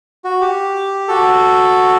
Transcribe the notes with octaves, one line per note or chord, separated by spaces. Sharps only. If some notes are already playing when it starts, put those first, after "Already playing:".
F#4
G4
F#4 A4